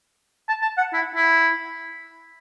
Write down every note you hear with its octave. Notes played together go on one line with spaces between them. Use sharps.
A5
A5
F#5
E4
E4